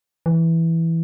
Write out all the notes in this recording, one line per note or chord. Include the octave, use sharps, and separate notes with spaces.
E3